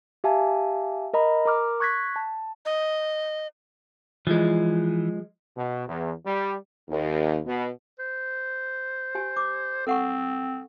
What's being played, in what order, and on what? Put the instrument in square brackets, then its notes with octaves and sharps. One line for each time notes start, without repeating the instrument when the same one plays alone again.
[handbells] G4 E5 F5 G#5 A5
A#4 D#5 A#5 B5
A#4 A#5 D6 F6
C#6 F#6 G#6 A#6 B6
A5
[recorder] D#5
[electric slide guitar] E3 [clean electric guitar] F3 G#3
[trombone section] B2
E2
G3
[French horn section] D#2
B2
[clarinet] C5
[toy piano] G4 G#5
D6
[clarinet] C4 [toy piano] A4 F#5 C#6